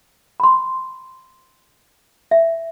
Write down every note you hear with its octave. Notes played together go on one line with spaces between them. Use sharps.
B5 C6
E5